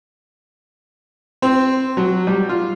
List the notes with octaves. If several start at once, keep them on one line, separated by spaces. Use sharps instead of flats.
C4
F#3
G3
F4